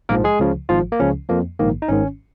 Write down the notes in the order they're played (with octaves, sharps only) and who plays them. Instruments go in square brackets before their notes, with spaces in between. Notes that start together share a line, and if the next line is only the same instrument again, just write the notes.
[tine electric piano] A#1 G#2 F3 A#3 A#4
G#3 G#4
C#2 C#3 F3
G#1 G#2 F3 F4
A#3
C#2 C#3 F3 C#4
F2 F3 A#3
A#1 G#2 D#3 A#3
D#4
G#1 G#2 D#3 C#4